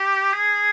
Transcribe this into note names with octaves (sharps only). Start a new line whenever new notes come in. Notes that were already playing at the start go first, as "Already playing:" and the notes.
Already playing: G4
G#4